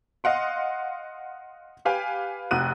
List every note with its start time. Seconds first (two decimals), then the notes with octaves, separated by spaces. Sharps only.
0.24 D#5 F5 F#5 C6
1.85 G4 B4 F5 G5 G#5
2.51 F1 C3 F#4 D#6 F#6 D#7